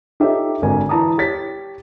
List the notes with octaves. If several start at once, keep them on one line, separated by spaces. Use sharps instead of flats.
D#4 F4 G4 A4 C#5 E5
G#1 D3 A#4 G#5
E3 E4 A5 A#5 D#6
G4 C#5 A6 B6